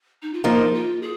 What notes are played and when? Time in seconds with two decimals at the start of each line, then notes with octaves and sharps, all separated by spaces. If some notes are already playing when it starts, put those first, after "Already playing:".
0.22 D#4
0.33 F4
0.44 F3 A#3 D#4 G#4
0.73 F4
1.02 G#4